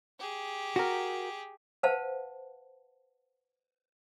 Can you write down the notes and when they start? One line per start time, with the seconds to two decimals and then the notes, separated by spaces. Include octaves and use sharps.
0.19 G4 G#4
0.76 F#4 A#4
1.83 B4 C5 F5 F#5 A5